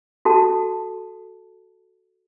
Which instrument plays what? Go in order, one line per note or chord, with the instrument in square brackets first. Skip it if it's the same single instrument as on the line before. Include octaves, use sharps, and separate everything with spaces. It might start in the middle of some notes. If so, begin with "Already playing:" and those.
[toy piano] F#4 A4 A5